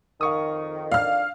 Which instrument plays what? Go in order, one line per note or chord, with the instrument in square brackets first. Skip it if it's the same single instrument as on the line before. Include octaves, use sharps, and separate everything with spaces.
[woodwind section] F2 D#3 [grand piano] F5 C#6 D#6
[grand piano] D4 [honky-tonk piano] F5 F6